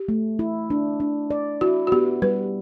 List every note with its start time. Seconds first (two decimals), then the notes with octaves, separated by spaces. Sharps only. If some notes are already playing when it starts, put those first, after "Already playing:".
Already playing: G4
0.09 A3
0.39 E4
0.70 D4
1.00 D4
1.31 D5
1.61 E4 F#4
1.87 F#4
1.92 B3 G4
2.22 G3 B4